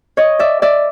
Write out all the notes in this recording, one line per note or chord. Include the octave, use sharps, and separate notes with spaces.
C#5 D#5
D5 E5
D5 E5